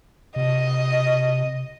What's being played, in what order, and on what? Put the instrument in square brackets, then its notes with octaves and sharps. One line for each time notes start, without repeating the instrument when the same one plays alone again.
[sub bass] C3 [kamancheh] D#5